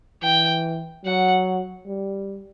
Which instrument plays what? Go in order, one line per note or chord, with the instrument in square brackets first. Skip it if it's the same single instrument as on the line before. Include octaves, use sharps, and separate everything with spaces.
[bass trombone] E3 [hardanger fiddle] G5
[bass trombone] F#3 [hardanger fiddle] F#5
[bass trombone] G3